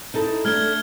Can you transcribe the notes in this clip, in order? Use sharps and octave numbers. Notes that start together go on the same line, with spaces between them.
D#4 E4 A4
A3 D4 F6 G#6 G7